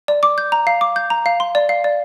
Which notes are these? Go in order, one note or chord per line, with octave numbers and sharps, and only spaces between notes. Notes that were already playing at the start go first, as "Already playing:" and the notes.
D5
D6
G6
A#5
F5
D6
G6
A#5
F5
C6
D5
F5
D5